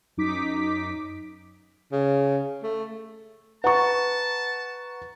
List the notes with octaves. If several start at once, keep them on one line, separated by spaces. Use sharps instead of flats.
F#2 D#4 D6 B6
C#3
A3
B4 F#5 A5 A#5 C#6